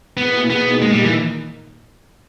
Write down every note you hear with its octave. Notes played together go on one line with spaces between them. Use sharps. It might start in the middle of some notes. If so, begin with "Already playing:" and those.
B2 A#3 B3 E4 G#4
B2 A#3 B3 D#4 G#4
A#2 G#3 A#3 D#4
G3
E3